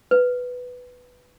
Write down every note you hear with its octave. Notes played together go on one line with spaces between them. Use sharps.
B4